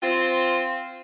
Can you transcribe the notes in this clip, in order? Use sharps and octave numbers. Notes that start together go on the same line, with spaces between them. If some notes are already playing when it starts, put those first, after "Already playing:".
C4 F4